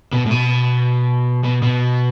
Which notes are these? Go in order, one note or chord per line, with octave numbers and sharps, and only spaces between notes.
B2
A2
B2
B2
B2